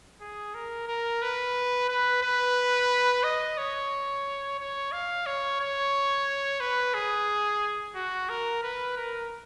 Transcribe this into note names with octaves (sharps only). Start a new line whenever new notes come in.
G#4
A#4
A#4
B4
B4
B4
D#5
C#5
C#5
F5
C#5
C#5
B4
G#4
F#4
A#4
B4
A#4